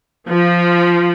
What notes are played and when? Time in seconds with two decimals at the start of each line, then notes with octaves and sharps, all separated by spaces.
0.28 F3